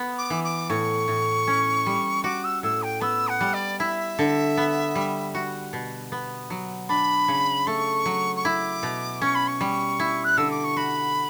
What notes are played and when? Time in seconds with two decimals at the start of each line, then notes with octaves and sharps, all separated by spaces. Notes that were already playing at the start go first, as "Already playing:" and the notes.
Already playing: B3
0.18 D6
0.30 E3
0.44 D6
0.70 A2 C#6
1.08 A2
1.47 C#4
1.86 G3
2.24 F#4 D6
2.44 E6
2.63 A2 E6
2.83 G5
3.01 B3 E6
3.28 F#5
3.41 G3
3.54 D5
3.79 E4 E5
4.19 D3
4.57 B3
4.95 G3
5.35 F#4
5.73 B2
6.12 B3
6.50 F#3
6.89 D4 B5
7.28 C#3
7.67 A3 C#6
8.06 F#3
8.36 C#6
8.45 E4 D6
8.83 B2
9.21 C#4 C#6
9.35 B5
9.47 C#6
9.61 G3
10.00 E4
10.24 F#6
10.37 D3 E6
10.51 D6
10.64 C#6
10.77 F#4 B5